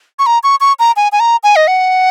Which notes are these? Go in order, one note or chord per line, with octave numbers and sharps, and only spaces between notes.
C#6
A#5
C#6
C#6
A#5
G#5
G#5
A#5
G#5
D#5
F#5